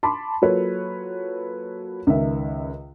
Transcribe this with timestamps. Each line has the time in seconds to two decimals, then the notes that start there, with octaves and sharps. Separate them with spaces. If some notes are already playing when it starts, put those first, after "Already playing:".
0.03 A5 B5 C6 D6
0.42 F#3 A#3 F4 A4 B4 C#5
2.07 C#2 D#3 E5